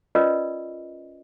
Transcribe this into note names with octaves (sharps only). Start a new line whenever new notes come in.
C#4 F4 A#4 B4 D5 D#5